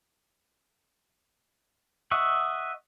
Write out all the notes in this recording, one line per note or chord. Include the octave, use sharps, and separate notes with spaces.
D#5 E5 F#5 C#6